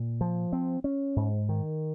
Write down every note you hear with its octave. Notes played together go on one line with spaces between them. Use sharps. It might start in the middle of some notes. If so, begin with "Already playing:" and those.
Already playing: A#2
F3
C4
C#4
G#2
D#3